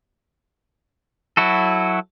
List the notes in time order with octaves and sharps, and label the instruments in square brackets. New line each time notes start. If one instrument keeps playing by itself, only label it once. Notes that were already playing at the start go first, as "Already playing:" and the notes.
[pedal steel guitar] F#3 E4 F#4 A4